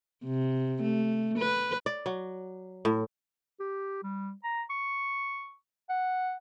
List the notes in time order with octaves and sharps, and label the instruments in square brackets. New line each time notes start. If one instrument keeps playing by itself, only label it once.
[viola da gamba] C3
A3
B4
[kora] D5
F#3
A2
[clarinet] G4
G3
A#5
C#6
F#5